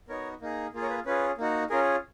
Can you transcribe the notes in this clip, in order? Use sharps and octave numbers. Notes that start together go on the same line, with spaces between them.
B3 D#4 F#4 A#4 C#5
A#3 D#4 G#4
A#3 F4 G#4
A#4 C#5
B4
C#4 F4 G#4 B4
A#3 D#4 F#4
C#4 F4 G#4 A#4